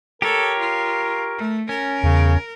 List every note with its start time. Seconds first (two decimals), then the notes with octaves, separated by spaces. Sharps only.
0.22 G4 A4 A#4 C#5
0.59 F4
1.38 A3
1.69 C#4 A#4
2.03 E2 C#3